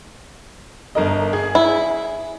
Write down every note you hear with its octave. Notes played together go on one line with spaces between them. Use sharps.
G1 A#4 D#5
G#4
E4